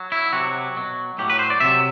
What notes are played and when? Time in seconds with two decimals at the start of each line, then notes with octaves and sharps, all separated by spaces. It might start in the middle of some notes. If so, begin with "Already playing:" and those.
Already playing: F#3
0.12 E4
0.33 C3 F#3 F#4
0.76 B2 F#3
1.18 A2 F#3 G4
1.30 B4
1.39 C5
1.50 D5
1.60 C3 F#3 E5